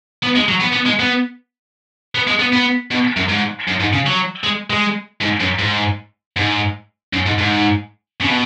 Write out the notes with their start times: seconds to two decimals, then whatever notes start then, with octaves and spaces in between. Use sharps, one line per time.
0.23 B3
0.36 G#3
0.49 F#3
0.61 B3
0.73 B3
0.86 G#3
0.99 B3
2.15 B3
2.27 G#3
2.39 B3
2.53 B3
2.91 B2
3.16 F#2
3.29 G#2
3.68 F#2
3.80 G#2
3.93 C#3
4.07 F#3
4.44 G#3
4.70 G#3
5.21 G#2
5.40 F#2
5.59 G#2
6.37 G#2
7.13 F#2
7.26 G#2
7.38 G#2
8.22 C#3
8.28 B2